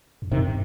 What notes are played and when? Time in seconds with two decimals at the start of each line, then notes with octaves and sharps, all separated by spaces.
0.22 F2
0.32 G2 C3 D#3